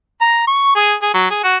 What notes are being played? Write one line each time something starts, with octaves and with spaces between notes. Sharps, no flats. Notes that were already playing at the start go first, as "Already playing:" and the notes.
A#5
C#6
G#4
G#4
F#3
G#4
F#4